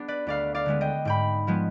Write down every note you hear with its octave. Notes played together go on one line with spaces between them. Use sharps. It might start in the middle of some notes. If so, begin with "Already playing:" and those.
Already playing: B3 D4 G#4
B4 D5
D2 D5 F5
D5 F5
D3 G#3 B3
D#5 G5
G#2 G5 B5
F3 G#3 B3